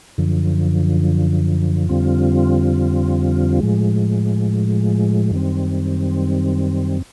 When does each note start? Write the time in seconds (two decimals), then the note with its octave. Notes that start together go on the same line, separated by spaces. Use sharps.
0.18 F#2 D3 F3
1.89 F2 D3 G3 C4 F4
3.60 A2 F3 G#3
5.31 F#2 D#3 G3 C4